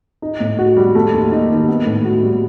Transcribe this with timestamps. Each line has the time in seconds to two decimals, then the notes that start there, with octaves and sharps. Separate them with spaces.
0.22 D#4
0.40 A2
0.59 F#4
0.77 G3
0.95 A3
1.13 D#2
1.31 D#4
1.50 D#3
1.68 B3
1.86 A2
2.05 F#4
2.23 G3